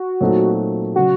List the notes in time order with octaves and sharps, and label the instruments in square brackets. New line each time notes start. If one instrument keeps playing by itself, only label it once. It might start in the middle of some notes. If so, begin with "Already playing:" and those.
Already playing: [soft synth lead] F#4
[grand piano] A#2 F#3 A3 C4 D#4
[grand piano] C#3 F#3 [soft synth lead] F#4